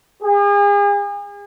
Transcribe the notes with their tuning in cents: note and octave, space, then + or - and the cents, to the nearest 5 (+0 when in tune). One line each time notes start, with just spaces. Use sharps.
G#4 -40